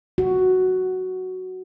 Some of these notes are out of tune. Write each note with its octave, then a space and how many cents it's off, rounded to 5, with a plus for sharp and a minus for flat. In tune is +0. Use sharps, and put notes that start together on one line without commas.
F#4 +5